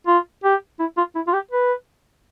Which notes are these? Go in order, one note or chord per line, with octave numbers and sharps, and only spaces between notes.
F4
G4
E4
F4
E4
F4
G4
B4